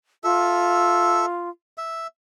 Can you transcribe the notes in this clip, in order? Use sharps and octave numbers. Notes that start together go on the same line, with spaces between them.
F4 A4 E5
E5